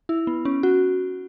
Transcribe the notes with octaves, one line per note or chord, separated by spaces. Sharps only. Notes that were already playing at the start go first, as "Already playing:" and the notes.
E4
B3
C#4
F#4